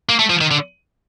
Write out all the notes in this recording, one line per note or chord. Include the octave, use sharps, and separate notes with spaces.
A#3
A3
F3
D#3
D3